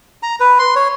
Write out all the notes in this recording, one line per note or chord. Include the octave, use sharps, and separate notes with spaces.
A#5
B4
C6
C#5